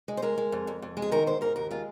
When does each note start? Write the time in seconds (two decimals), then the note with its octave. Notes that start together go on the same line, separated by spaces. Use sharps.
0.08 G#3
0.17 C5
0.22 G#3 A#4
0.38 G#3
0.52 F2
0.67 F2
0.82 F2
0.97 G#3
1.02 G#4
1.11 D#3 A#4
1.27 G#2 C5
1.41 G#2 A#4
1.56 D#2 A#4
1.71 G#3 F4